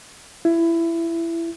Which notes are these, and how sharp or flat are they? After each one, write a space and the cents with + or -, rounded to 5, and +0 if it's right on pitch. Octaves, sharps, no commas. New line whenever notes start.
E4 +20